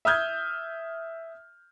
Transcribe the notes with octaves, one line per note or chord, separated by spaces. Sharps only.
E5 D#6 F6 G6 G#6